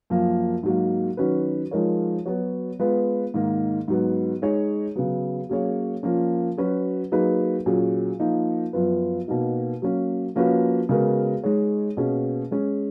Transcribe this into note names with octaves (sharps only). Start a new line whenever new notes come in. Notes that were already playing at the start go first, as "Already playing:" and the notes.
F#2 F3 A#3
G#2 F#3 A#3
D#3 F#3 C#4 F#4 B4
F3 G#3 D#4 A#4 C#5
F#3 B3 F#4 C#5
G#3 B3 F4 B4
G#2 D#3 A#3
G#2 F#3 B3
G#3 D#4 G#4 C#5
C#3 F#3 B3
F#3 A#3 C#4 G#4 C#5
F3 A#3 C#4
F#3 C#4 F#4 B4
F#3 A#3 D#4 G#4 B4
A#2 F#3 C#4 G#4
F3 A#3 D#4
F#2 F3 B3 F4 B4
B2 A#3 D#4 F#4
F#3 A#3 C#4
F3 A#3 C#4 F#4 B4
C#3 G#3 B3 F#4 A#4
G#3 D#4 G#4 C#5
B2 A#3 C#4 G#4
G#3 C#4 G#4